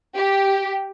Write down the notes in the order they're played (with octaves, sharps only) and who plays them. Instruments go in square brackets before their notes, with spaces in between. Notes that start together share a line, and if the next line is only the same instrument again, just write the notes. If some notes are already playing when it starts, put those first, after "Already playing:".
[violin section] G4